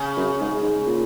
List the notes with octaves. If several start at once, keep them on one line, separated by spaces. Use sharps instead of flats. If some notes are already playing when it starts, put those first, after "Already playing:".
Already playing: C#3
F#2
G#2
G#2
A#2